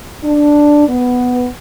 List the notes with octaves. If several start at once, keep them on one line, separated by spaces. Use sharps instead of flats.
D4
B3